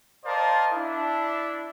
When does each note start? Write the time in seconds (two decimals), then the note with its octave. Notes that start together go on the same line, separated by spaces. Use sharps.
0.25 A#4 C5 D5 D#5 F5 A5
0.73 D4 E4 E5